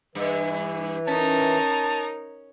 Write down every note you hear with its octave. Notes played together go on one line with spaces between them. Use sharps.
G2 E3
C#4 D#4 A#4 A5